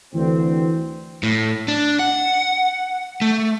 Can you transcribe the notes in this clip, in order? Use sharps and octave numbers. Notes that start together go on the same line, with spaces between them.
D2 E3 C4
A2
D4
F#5
A3